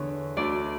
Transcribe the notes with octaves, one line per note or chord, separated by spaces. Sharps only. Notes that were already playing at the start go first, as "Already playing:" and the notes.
Already playing: E2 D3 C#5
D2 D3 D5